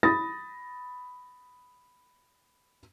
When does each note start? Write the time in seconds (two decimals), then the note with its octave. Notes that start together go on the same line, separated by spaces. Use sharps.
0.03 B5 D#6 A6 A#6